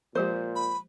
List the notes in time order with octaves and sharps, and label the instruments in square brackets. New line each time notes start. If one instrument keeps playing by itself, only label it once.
[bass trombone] A#2 [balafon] F3 G#3 G4 [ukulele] C5
[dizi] B5